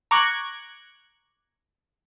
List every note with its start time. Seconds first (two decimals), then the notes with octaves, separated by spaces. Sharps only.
0.11 A#5 C#6 D6 F#6 G#6